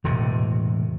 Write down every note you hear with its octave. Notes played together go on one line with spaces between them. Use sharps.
E1 A2 C3